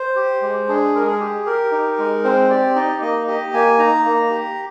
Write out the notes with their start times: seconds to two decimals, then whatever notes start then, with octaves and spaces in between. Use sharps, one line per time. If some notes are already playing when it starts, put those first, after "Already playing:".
Already playing: C5
0.16 G4
0.42 G#3
0.69 D4 G#4
0.94 G#3 A#4
1.07 G#4
1.20 G4
1.46 G4 A#4
1.72 D#4
1.98 G#3
2.24 C4 C5
2.50 G4 D5
2.75 D#4 D#5
3.02 A#3 D#5
3.27 G4 D#5
3.53 A#3 G#5
3.79 D#4 A#5
4.05 A#3
4.31 G4